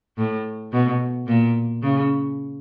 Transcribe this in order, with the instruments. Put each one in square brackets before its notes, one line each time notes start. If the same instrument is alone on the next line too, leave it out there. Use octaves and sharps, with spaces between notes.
[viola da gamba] A2
B2
A#2
C#3